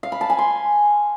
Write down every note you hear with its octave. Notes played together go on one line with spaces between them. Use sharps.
F5
B5
A5
G#5
C6